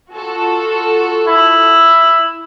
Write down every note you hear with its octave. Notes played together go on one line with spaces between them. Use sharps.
F4 F#4 A4
E4